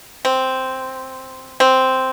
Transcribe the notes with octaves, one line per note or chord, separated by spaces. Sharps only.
C4
C4